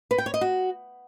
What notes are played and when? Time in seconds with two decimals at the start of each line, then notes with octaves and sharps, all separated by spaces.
0.11 B4
0.18 G5
0.26 C#5
0.34 D#5
0.41 F#4